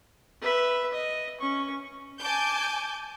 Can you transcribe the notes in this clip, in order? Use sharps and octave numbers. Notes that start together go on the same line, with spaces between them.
B4 E5
D#5
C#4 C#6
G#5 A5 D6 G6